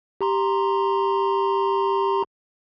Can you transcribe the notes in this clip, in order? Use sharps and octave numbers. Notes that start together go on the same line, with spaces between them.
G4 A#5 C6